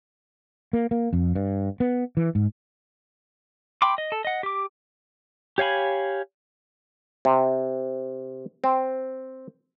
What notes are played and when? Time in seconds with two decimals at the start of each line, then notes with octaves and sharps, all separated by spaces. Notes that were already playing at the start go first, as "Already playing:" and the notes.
0.73 A#3
0.91 A#3
1.13 F2
1.35 G2
1.80 B3
2.17 E3
2.35 G#2
3.82 G5 B5 C6 D6
3.98 D#5
4.12 A4
4.25 D#5 F#5
4.43 G4 D6
5.58 G4 C#5 F5 G#5 B5
7.25 C3
8.64 C4